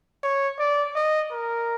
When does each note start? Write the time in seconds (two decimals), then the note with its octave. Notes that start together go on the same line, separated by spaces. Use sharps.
0.23 C#5
0.59 D5
0.95 D#5
1.32 A#4